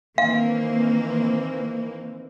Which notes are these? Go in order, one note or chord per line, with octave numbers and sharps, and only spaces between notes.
D#3 E3 A#3 C4 F5